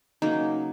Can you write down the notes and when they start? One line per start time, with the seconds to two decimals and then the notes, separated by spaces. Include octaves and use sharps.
0.22 C#3 F#3 A#3 D#4